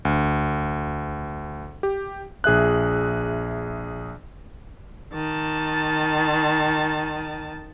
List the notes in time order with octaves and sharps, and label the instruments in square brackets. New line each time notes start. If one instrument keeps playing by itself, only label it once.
[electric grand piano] D2
G4
A#1 G#4 E5 F#6
[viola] D#3 A5